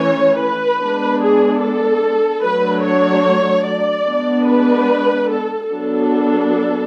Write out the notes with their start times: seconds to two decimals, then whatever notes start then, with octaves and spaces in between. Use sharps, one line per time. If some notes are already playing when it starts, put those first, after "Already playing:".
Already playing: E3 A3 C#4 C#5
0.39 B4
0.80 G#3 B3 D4
1.21 G#4
1.61 A4
2.43 F#3 A3 D4 B4
2.84 C#5
3.65 D5
4.07 G#3 B3 D4
4.47 B4
5.29 A4
5.69 F#3 B3 D4 A4